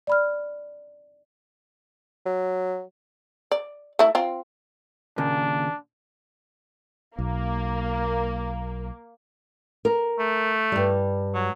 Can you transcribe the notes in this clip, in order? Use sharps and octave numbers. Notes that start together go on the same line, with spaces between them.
D5 B5 F6
F#3
D5
A3 E4
C4 F4
D#2 A#2 C#3 D4
B1 A#3
A#4
A3
G2 G3
F#3